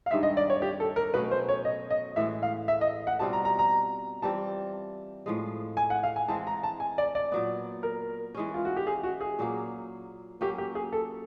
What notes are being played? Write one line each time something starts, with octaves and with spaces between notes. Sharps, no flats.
F5
G2 D#3 G#3 C4 E5
D#5
D5
C#5
G4
A4
A#4
B2 F#3 A3 C#4 B4
C5
C#5
D#5
D#5
A2 E3 G#3 E5
F5
E5
D#5
F#5
B2 G3 C4 F4 A5
A#5
A#5
A#5
E3 G3 C4 F4 A5
A2 F3 G#3
G#5
F#5
F5
G#5
E3 G#3 C4 A5
A#5
A5
G#5
D5
D5
A#2 F#3 B3
A#4
E3 G#3 C#4
F4
F#4
G4
G#4
F#4
G#4
A#2 F#3 A#3
F#3 A#3 C#4 G4
G4
G#4
A4